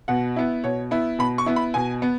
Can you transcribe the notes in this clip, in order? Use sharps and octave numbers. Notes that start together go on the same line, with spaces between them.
B2 F#5
B3 E4
B2 C#5
B3 E4
B2 B5
C#6
B3 E4
B5
B2 G#5
B3